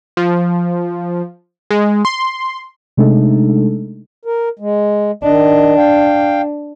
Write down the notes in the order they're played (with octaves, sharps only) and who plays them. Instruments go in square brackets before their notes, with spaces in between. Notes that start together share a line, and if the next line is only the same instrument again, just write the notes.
[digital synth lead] F3
G#3
C6
[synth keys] C3 G#3 A3 D4 D#4 A4
[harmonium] A#4
G#3
[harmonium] D#3 D#5 [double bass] D4
[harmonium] F5 G5